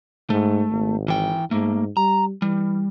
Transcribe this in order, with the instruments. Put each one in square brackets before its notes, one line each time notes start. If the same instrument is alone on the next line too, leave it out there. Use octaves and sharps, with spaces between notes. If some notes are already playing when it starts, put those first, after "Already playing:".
[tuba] G#2 [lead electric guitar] A3
[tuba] G#1
[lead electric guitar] E3 G5
[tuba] G#2 [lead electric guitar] A3 A#3
[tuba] G3 [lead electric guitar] A#5
[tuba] E3 [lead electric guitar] G3